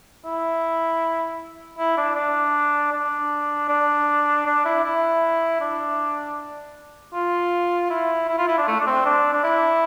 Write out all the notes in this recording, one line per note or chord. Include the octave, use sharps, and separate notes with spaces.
E4
E4
D4
D4
D4
D4
D4
E4
E4
D4
F4
E4
E4
F4
E4
D4
A3
D4
C4
D4
D4
E4